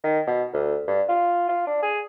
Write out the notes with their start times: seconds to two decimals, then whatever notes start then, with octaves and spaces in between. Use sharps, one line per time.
0.04 D#3
0.27 B2
0.53 D2
0.88 G2
1.09 F4
1.49 F4
1.67 D4
1.83 G#4